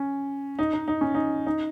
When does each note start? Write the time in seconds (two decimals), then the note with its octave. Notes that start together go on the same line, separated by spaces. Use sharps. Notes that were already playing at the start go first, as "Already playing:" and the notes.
Already playing: C#4
0.59 D#4
0.73 D#4
0.88 D#4
1.01 C#4
1.14 D#4
1.47 D#4